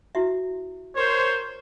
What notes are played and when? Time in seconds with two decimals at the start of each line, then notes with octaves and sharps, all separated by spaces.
0.15 E4 F#4 E5
0.96 A#4 C5 C#5